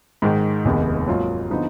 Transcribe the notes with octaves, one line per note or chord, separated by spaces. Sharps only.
G#2 D#3 G#3
F1 D#2 D#3 G#3 B3
G#2 F#3 A#3 F4
D3 F3 B3 D#4